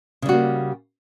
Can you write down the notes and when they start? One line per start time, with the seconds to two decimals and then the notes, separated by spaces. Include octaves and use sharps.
0.22 C#3
0.26 G3
0.29 F#4
0.32 A#3